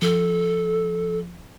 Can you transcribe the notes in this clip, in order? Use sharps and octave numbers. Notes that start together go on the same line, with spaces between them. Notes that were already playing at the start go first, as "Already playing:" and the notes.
F3 A4